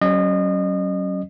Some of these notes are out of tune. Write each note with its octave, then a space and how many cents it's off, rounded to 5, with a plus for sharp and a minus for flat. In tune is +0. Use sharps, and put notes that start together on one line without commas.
F#3 +30 C#4 -15 D#5 -30